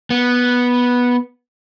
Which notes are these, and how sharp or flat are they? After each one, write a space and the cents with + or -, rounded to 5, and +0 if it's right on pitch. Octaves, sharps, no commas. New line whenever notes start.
B3 -10